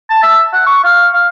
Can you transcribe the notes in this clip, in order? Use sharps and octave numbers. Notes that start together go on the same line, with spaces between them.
A5
E5
F#5
C#6
F5
F5